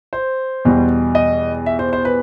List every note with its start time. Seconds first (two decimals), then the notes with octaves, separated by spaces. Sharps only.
0.13 C5
0.65 E2 B2 G3
1.15 D#5
1.66 E5
1.79 C5
1.93 C5
2.05 B4